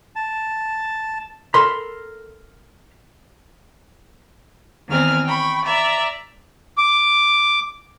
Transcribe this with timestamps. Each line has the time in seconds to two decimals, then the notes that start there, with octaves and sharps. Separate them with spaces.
0.16 A5
1.54 A4 A#4 B5 C6
4.88 E2 D#3 C4 G#5 F6
5.24 G5 B5 C#6
5.65 D5 E5 A#5
6.78 D6